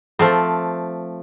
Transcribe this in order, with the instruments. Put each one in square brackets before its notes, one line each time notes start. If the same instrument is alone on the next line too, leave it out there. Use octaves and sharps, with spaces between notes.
[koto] F3 A3 C4